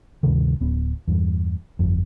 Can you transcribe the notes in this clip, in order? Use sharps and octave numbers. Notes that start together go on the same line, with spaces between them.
D2 G2 C3 D#3
D1 B3
E2 G2
G1 F2